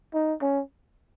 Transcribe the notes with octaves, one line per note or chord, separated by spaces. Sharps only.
D#4
C#4